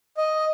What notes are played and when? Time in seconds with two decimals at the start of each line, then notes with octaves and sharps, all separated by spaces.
0.17 D#5